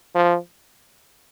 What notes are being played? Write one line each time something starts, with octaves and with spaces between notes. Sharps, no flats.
F3